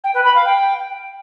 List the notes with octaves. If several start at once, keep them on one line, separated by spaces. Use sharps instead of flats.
G5
B4
B5
F5
G5